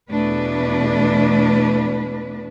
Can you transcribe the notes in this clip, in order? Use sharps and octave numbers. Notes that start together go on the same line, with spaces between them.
E2 B2 A3 D4 B4